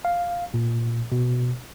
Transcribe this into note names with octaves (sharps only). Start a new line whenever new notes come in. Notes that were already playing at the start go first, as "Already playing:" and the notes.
F5
A#2
B2